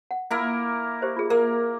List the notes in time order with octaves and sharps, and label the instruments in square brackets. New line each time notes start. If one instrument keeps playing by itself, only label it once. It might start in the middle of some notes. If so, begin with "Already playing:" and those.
[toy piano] F#5
[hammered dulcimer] A#3 E4 A#4
[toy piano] G4 C5 D#5
F4 G#4
[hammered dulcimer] A#3 [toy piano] A#4